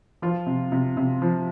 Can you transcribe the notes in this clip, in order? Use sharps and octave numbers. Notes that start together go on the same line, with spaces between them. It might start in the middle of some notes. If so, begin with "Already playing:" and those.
F3 F4
C3
C3
C3
F3